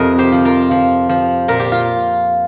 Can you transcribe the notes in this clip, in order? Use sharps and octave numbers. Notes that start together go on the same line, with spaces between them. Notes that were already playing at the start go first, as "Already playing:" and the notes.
Already playing: F2 C3 A#4 D#5
G4 C5
F3
F4 A#4
F3
F3
A#2 A#4
G4
F4